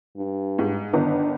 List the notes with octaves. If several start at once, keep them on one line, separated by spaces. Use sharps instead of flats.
G2
G#2
G1 D#3 B3 D4